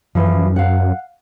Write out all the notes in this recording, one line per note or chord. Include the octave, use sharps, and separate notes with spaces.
F#2 E3 F3
F5 F#5